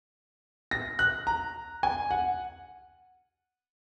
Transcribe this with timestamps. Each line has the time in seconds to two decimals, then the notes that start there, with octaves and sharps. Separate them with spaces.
0.71 A#6
0.99 F#6
1.27 A#5
1.83 G#5
2.11 F#5